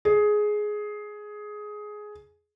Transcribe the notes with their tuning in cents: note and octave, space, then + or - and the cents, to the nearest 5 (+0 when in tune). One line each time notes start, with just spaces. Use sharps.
G#4 +10